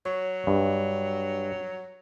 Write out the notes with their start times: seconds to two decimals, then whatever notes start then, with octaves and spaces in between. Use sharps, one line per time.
0.06 F#3 C#5
0.47 G2